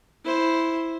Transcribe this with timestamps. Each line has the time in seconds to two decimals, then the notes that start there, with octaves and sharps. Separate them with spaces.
0.25 E4 C5